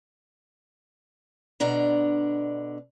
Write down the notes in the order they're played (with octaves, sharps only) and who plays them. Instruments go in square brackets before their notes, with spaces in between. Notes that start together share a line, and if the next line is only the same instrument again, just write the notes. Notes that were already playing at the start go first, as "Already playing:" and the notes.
[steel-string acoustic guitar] B2 D3 D4 A#5